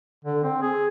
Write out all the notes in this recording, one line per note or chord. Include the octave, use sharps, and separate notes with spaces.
D3
C4
G#4